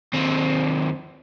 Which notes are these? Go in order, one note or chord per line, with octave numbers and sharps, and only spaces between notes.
D#2 C4